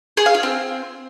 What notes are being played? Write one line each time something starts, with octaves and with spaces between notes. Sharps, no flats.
G#4
F5
F4
C4